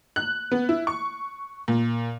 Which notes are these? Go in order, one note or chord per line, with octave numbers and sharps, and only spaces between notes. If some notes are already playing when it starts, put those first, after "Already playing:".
F#6
B3
E4
C#6
A#2